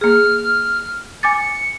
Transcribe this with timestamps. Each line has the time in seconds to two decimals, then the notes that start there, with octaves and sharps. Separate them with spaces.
0.01 A#3 G#4 F6
1.23 G#5 D6 A6 C#7